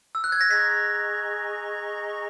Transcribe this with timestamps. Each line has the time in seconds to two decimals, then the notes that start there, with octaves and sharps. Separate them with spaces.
0.15 E6
0.24 F#6
0.32 G#6
0.41 A#6
0.50 G#4 D#5 A#5 C#6 B6